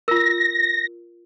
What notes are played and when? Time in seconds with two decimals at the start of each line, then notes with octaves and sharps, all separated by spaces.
0.08 F4 A#4 A#6